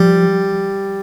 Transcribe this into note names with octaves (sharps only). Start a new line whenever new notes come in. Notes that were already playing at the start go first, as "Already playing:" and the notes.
Already playing: F3 G3